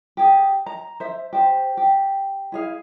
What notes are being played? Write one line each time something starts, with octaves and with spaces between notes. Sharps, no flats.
G4 G#4
A#5
C5 E5
G4 C5
G4
E4 G#4 F5